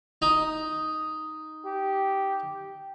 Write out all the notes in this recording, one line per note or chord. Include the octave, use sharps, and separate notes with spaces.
D#4
G4